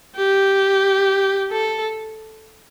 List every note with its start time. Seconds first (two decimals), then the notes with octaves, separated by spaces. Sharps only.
0.16 G4
1.52 A4